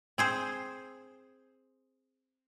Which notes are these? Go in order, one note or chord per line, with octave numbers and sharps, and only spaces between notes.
C4 G#4 C5